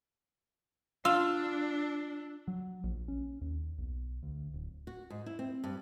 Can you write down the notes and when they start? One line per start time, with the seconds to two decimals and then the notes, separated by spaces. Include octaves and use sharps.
1.05 D4 F4 E6
2.48 F#3
2.84 A#1
3.08 C#4
3.41 D#2
3.78 B1
4.23 D2
4.54 D1
4.87 F#4
5.10 G#2
5.26 E4
5.39 C4
5.64 G2